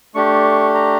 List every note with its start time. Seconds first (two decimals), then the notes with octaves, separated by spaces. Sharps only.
0.15 A3 D4 G4 C#6
0.74 A#5